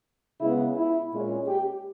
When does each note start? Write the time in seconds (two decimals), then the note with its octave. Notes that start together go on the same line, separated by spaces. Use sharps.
0.40 C#3 G#3 B3 E4
0.76 E4
1.12 A#2 G#3 C#4
1.48 G4